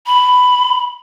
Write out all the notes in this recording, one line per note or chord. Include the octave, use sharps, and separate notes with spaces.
B5